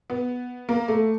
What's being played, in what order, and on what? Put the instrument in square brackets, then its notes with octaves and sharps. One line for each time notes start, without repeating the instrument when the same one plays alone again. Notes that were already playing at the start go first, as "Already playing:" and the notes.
[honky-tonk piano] B3
A#3
A3